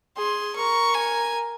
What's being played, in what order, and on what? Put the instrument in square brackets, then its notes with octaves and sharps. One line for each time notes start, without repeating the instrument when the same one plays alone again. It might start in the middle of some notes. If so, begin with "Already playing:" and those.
[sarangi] G#4 [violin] C6
[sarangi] A#4 [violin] C#6
[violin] G#5